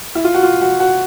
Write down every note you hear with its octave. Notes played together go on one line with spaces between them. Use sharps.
E4
F4
F#4
F4
F#4
F#4